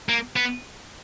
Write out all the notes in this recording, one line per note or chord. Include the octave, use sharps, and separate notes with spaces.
A#3
B3